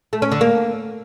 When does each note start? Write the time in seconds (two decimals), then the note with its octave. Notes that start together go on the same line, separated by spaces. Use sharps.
0.13 A3
0.22 C#4
0.31 D3
0.41 A#3